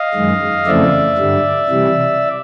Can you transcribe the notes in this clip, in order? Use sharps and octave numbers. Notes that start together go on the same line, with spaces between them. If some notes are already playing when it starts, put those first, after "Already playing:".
Already playing: D#5 F5
F#2 D#3 G#3
F2 C#3 E3 A3 C4 D5 E5
G2 D3 G3
C3 E3 G3